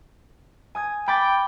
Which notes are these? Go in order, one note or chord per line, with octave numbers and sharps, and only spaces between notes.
G#5 D#6 G#6
G5 B5 D6 A6